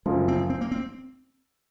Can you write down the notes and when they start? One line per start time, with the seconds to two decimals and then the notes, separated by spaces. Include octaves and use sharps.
0.06 F#1 F#2 F3 G#3
0.28 C4
0.50 C4
0.61 A#3
0.71 C4